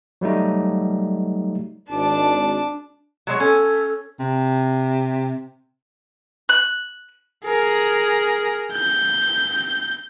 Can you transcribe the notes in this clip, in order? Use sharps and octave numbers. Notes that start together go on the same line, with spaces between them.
F#3 G3 A3 D#4
G#1 D4 A5 D6
F#3 G#3 C#5
C#4 A4
C3
F#6
G#4 A#4
G6